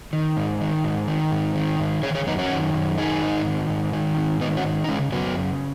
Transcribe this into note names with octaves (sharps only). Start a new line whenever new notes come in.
D#3
G#2
D#3
G#2
D#3
G#2
D#3
G#2
D#3 G#4 C#5
G#4 C#5
F#2 B3 D#4
C#4 F#4
D#3
F#2
D#3 D#4 G#4
G#2
D#3
G#2
D#3
G#2
D#3 B3 D#4
C#4 F#4
G#2
D#4
C#3 G#3 C#4
F#2 F#3 B3
C#3